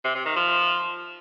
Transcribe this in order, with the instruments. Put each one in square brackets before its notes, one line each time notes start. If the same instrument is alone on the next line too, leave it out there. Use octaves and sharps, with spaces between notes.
[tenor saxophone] C3
C3
D#3
F3